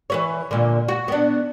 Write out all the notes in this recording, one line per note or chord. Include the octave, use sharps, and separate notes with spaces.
E3 B4 C#5
A#2 D3
F#4
B3 D4